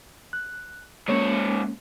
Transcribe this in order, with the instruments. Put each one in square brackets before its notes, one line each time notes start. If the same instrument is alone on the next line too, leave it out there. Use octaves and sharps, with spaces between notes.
[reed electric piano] F#6
[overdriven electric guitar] G#2 C#5 [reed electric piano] G#3 A#3 C#4